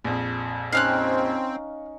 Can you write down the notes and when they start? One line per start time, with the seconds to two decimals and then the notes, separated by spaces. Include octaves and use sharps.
0.04 A#1 F2
0.73 C4 C#4 D#4 F5 F6 F#6